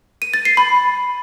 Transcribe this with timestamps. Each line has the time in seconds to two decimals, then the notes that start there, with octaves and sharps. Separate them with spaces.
0.22 D#7
0.34 A6
0.45 C7
0.57 B5